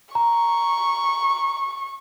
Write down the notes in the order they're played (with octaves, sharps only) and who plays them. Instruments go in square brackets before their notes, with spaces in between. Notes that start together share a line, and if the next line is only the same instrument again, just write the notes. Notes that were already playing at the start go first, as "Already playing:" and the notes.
[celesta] A#5 [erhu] C#6